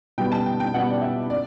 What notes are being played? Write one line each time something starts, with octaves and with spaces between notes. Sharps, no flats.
B2 G3 B3 G5
A5
G5
G5
B2 G3 B3 F#5
D5
E5
D5